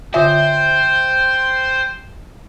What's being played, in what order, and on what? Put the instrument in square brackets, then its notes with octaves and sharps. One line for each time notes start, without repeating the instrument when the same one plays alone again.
[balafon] D3 F4 G#5 [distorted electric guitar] C5 [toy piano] E5 [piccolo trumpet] G5